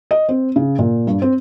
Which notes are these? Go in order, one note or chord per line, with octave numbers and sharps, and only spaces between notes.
D#5
C4
C#3
A#2
G2
C4